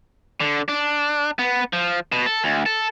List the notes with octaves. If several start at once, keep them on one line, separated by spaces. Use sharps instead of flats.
D3
D4
B3
F3
B2
A4
D2
A4